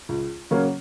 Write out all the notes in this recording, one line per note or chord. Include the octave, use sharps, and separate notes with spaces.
C#2
C#3 F#3 A#3 C#4